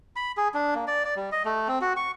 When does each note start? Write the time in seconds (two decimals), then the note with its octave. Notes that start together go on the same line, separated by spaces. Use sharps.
0.16 B5
0.37 G#4
0.54 D4
0.75 A#3
0.88 D5
1.05 D5
1.16 G3
1.32 D#5
1.45 A3
1.68 C4
1.82 F#4
1.96 C#6